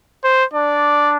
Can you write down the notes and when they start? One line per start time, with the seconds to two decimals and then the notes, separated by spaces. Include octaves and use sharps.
0.24 C5
0.53 D4 D5